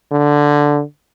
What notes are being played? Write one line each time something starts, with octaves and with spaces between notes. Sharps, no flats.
D3